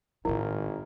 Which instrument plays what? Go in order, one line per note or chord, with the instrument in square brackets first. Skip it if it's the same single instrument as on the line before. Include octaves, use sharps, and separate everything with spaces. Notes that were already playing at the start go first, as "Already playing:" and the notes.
[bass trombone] G#1 [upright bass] A2 D#3 [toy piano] E4 [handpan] A#4